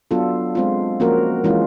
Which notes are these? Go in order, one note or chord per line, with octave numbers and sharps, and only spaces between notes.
F#3 B3 D4 F4 A4
G#3 C4 F4
F3 A#3 C#4 F#4 A#4
E3 G#3 C#4 F4